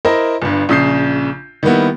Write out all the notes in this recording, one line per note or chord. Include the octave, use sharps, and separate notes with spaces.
E4 A#4 C5 D#5
G1 G2
A#1 C#3 D#6 G6 C7
D#3 G3 A#3 B3 E4